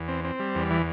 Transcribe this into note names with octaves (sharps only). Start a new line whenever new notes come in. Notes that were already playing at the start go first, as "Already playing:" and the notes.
Already playing: E2
C4
C4
G3
E2
E3